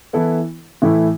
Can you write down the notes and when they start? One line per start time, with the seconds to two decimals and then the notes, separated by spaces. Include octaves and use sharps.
0.13 E3 B3 E4 A4
0.82 A2 E3 A3 E4